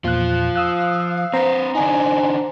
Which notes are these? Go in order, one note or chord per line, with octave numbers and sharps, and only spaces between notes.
E2 A#2 F3 F4 F#6
F5 D#6 E6 F#6
C4 B4 C5 A#5 C6
D3 D4 D#4 G#5